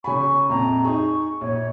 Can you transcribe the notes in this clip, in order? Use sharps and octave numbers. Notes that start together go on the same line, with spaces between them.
C#3 G#5 B5 C#6
A#1 F2 A#5
D#4 G#4 C#6
A#1 C#5